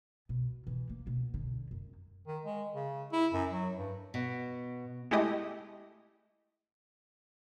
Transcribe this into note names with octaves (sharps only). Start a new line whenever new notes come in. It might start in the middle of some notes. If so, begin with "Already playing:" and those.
B2
E3
A#3
B2
D3
F#2
D#3
G#3
C#3
E4
F#2
F#3
G2
B2
G#3 A3 E4 G4 D#5